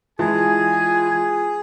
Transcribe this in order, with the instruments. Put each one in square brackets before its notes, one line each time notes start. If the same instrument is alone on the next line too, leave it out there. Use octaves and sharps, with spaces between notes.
[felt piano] E3 G#3 A5 [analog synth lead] F4 [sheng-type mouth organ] G#4 [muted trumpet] G#5